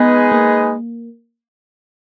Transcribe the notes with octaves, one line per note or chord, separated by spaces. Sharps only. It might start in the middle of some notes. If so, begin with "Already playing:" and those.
Already playing: G#3 B3 D#4 G#4 B4 D#5
A#3